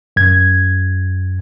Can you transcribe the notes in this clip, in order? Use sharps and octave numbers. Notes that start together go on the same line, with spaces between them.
F#2 G#6